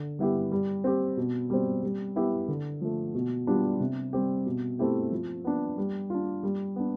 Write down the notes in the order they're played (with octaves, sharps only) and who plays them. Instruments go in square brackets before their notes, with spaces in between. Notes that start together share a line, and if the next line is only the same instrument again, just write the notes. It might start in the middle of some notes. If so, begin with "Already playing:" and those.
Already playing: [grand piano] D3
G3 B3 E4 G4
G3
C4 G4
B2
G3 C4
G3
B3 E4 G4
D3
F3 A3
B2
G3 B3 D4 F4
C3
G3 C4 G4
B2
A3 C4 E4 G4
F3
B3 D4
G3
D4 F4
G3
B3 D4